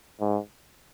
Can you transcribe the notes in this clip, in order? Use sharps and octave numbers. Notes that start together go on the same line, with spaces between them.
G#2